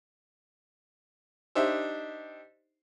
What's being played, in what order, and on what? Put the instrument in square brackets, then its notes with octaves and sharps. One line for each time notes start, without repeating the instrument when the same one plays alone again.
[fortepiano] D4 D#4 G4 C5 E5